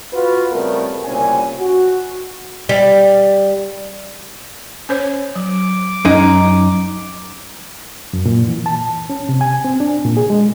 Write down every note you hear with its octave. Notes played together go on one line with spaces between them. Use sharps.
F4 F#4 B4
C#3 G3 A3 B3 C4 A#4
C2 A#2 C#3 C4 C#4 G#5
F#4
G3
C#4 C5 C#5
F#3 D6
F#2 C#4 D#4
F#2
A#2
E3
A5
C#4
C3
G#5
C4
D4
A#2
G#4
G#3